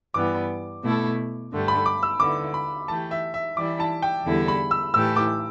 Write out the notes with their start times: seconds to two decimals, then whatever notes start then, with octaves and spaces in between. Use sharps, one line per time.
0.14 G2 E3 G3 B3 D6
0.82 B2 A3 E4 A4
1.51 G2 D3 A3 G4
1.68 B5
1.86 D6
2.03 E6
2.20 D3 B3 E4 D6
2.54 B5
2.88 E3 A3 G4 A5
3.11 E5
3.34 E5
3.57 E3 G3 E4 D6
3.80 A5
4.02 G5
4.25 E2 D3 G3 E4 A4
4.48 B5
4.71 E6
4.94 A2 E3 A3 G4 E6
5.16 D6